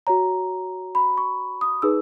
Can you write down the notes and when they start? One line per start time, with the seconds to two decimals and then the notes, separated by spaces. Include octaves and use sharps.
0.07 F#4 C#5 A#5
0.95 B5
1.18 C#6
1.61 D#6
1.82 D#4 G#4 B4 E6